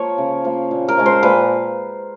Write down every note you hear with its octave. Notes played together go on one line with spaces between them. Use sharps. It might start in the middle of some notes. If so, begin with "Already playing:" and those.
Already playing: F3 A#3 C#5
C#3
F3 A#3
A#2
A#4
F3 G#3 C#4
C5
A#2 B4